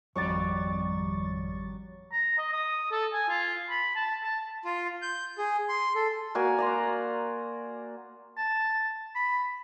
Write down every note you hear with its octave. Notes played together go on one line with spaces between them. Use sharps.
G#1 F2 F#3 G3 D5 C#6 D6 A6
A#5
D#5
D#6
A4
G#5
F4
B5
A5
A5
F4
G6
G#4
C6
A4
A#3 F#4 D5 G#5
D5 A#5 C6
A5
B5